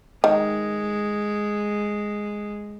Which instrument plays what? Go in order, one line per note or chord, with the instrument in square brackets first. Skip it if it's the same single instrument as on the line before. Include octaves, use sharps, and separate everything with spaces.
[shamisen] D#3 [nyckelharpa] G#3